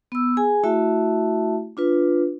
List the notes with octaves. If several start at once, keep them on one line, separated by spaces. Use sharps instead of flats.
B3 E6
G#4 G#5
A3 E4 F#4 E5 A5
D4 F4 B4